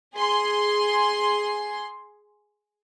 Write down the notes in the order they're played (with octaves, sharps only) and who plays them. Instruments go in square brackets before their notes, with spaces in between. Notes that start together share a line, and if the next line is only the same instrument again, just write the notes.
[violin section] G#4 C6